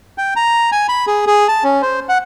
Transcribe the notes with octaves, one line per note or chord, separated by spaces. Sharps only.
G5
A#5
G#5
B5
G#4
G#4
A5
C#4
C5
F#5